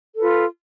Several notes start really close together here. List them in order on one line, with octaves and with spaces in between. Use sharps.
A4 B4 F4